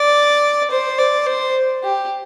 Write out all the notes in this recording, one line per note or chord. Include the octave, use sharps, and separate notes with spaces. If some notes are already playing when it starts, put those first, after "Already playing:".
Already playing: D5
C5
D5
C5
G4